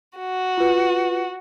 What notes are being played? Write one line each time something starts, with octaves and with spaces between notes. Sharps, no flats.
F#4
F4 B4